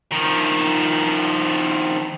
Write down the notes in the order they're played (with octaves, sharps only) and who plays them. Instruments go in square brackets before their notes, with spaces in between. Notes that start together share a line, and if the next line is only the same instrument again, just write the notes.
[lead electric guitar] D#3 F3